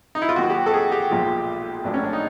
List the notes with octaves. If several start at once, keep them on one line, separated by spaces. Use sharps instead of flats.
D#4
E4
F4
D#2 D#3 F#3 F#4
G4
A4
G#4
G4
B1 A#2 F3 G#3
A#1 A2 F#3 D4
C#4
D4
D#4